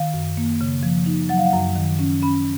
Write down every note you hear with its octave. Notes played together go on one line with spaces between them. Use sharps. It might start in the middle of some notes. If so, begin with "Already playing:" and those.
Already playing: D#3 F5
F#2
A#3
C#3
F3
D#4
F#3 F#5
F5
F#5
F#2
D#3
C#4
C#4 B5